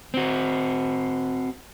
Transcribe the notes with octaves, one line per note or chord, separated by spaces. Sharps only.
C4 F#4